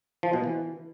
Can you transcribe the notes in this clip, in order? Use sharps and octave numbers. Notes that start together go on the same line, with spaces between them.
F3
B2
E3